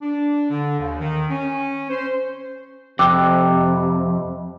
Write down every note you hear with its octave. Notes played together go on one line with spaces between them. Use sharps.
D4
D3
D#2
D#3
C#4
C5
F2 C3 G5 D6 E6 F#6